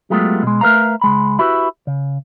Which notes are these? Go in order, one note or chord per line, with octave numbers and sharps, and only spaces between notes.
F#3 G#3 A3 B3 F4 G4
B2 G#3
A3 A#4 B4 F5 A#5
C#2 G#3 B5
E4 F#4 G4 B4
C#3